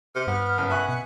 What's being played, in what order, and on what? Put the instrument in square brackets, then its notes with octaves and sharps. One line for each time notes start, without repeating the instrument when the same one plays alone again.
[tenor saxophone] C3 [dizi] F6
[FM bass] G2 [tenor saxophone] B3
[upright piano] F#1
[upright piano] E5 G#5 C#6 [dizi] F#6
[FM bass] B2 [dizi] F#5